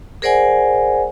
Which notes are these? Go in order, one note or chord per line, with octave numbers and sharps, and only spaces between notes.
G#4 A#4 C5 D5 F#5 G#5